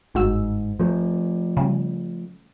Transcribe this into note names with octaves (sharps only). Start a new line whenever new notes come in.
G1 G#2 F#4 E6
F3 A3
C#3 G3